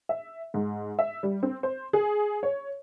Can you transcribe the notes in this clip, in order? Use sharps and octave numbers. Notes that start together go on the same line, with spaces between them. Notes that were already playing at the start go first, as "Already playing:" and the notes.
E5
G#2
E5
G3
C4
C5
G#4
C#5